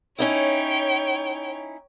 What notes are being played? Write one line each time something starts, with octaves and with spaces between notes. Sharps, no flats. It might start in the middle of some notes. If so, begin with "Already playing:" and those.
C#4 D#4 E4 C#5 G5